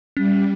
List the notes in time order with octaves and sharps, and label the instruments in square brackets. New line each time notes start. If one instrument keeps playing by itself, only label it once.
[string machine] G3 [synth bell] C#4